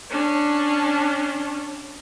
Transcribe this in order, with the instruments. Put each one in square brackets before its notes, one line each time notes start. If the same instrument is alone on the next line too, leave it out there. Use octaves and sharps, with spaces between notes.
[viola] C#4 D4